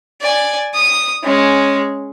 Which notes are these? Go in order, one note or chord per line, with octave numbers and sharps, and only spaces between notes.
D5 G#5
D#6
G#3 C#4